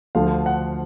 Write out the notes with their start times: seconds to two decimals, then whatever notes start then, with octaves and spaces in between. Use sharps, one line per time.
0.15 D2 D3 F3 F5
0.46 F#5